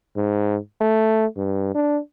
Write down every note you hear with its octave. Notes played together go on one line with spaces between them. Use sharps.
G#2
A3
G2
D4